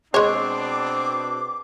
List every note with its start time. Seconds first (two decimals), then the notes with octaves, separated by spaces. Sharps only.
0.14 B2 G#3 C4 D4 G#4 C#5 D6